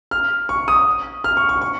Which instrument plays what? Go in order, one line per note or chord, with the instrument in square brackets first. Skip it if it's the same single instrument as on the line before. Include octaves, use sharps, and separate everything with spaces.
[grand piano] F6
C#6
D#6
F6
C#6
C#6
C#6